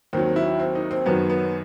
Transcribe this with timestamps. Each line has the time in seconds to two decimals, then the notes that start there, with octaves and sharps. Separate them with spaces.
0.13 D#2 D#3 F#3 C4
0.36 E4
0.60 C4
0.75 D#4
0.91 C4
1.06 F#2 D#3 F#3 B3
1.30 B3